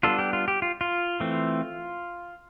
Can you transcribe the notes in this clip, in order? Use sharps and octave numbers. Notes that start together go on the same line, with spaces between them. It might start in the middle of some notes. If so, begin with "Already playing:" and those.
G3 B3 D4 F4 A4
G4
F4
G4
F4
F4
E3 A3 C4